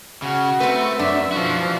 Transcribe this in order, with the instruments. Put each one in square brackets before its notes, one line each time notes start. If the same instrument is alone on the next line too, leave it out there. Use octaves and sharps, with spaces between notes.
[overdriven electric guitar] C#3 [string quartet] F#4
[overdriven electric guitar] A3 [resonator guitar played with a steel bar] C4 B4
[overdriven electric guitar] F#2 [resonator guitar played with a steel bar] D4 [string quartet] E5
[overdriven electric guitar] E3 F#4 [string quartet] F3